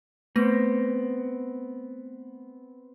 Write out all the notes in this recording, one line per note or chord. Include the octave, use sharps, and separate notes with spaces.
A3 B3 C4 A#6